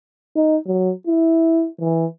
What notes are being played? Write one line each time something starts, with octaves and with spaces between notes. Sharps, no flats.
D#4
F#3
E4
E3